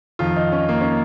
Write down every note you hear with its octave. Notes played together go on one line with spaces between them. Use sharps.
F2 D#3 F4
D#4
C#4
A#3
C#4